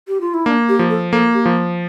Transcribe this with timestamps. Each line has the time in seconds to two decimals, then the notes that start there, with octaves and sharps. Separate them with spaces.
0.08 G4
0.21 F4
0.34 E4
0.46 A#3 D4
0.69 G4
0.79 F3
0.90 A4
1.12 A#3 A4
1.34 G4
1.46 F3